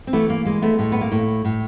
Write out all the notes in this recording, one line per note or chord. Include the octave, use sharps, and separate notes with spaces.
C4
E3 A3 B3
A#3
G#3 A#3
A3 B3
A2 A3
B3
A#3
A2
A2